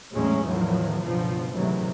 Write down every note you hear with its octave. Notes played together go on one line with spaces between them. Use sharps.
E2 A2 F#3 G#3 C#4
E2 A2 D#3 F3 F#3
C#2 G2 B2 F3
D2 G#2 C3 D#3 E3 F#3